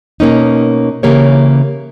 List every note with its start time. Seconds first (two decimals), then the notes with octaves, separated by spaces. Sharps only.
0.20 B2 A#3 C#4 D#4
1.03 C#3 E3 A#3 G4 C#5